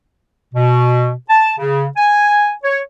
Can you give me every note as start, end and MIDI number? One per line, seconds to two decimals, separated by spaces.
0.54 1.12 47
1.29 1.52 81
1.59 1.85 49
1.97 2.51 80
2.64 2.80 73